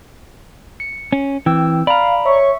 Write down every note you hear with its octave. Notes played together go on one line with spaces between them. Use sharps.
C#7
C#4
E3 C4 G5 E6
D5 F5 A#5 B5
C#5 E5 C#6